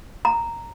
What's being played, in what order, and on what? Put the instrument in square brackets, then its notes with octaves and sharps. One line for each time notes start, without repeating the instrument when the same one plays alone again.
[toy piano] A#5